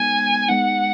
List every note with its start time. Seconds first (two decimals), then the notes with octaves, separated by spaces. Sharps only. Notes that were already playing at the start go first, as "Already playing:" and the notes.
Already playing: G#3 B3 D#4 G#5
0.48 G#3 B3 D#4 F#5